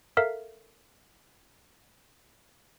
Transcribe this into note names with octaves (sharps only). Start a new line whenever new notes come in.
A4 A#4 E5 F5